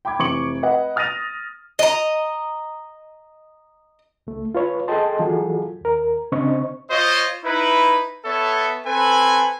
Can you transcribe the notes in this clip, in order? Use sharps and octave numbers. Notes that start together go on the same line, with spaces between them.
G5 B5 D6 G#6
F1 E3 C#6 D6 C#7 F#7
B4 D#5 F#5
D#6 F6 A6 A#6 D#7 F7
D#5 A#5
C#2 A3
F4 B4 C#5
G#4 A4 D#5 G5 A5 C6
E3 F#3 F4 F#4 G#4 A4
D#2 A#4
C#3 C4 D4 C5 D#5 C#6
F4 C5 C#5 D#5
D#4 E4 B4
B3 A4 C#5 E5
C4 A4 B4 G#5